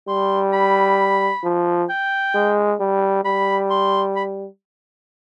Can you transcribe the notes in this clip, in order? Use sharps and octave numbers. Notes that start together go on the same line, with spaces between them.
G3 C6
B5
F3
G5
G#3
G3
G3 B5
C6
B5